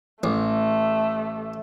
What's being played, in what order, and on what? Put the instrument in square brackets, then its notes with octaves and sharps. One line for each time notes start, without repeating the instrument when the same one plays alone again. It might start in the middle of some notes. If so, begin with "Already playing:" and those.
[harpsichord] A1 [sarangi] A3